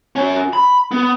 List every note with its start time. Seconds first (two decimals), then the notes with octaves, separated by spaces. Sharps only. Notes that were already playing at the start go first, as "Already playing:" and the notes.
0.16 C#4 F#4
0.53 B5
0.92 B3